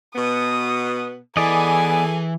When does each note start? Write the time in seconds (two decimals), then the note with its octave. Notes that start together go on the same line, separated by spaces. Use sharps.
0.15 B2 B3 D#6
1.37 E3 B3 G#4 A4 D5 D#5 G#5